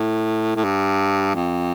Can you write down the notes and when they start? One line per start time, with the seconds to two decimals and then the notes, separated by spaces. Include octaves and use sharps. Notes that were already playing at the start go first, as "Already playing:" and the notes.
Already playing: A2
0.56 A2
0.64 G2
1.35 F2